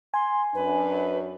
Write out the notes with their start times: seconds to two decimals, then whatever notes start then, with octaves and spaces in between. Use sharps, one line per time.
0.14 G#5 C6
0.54 F#2 D4 B4